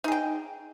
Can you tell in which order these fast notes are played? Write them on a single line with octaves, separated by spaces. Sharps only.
D#4 G#4 G5